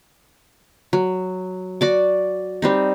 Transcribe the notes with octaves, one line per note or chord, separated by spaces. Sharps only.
F#3
F#4 D5 D6
G3 C4 D#4